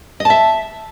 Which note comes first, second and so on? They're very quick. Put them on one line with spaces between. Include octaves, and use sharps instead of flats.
D#5 A5 E5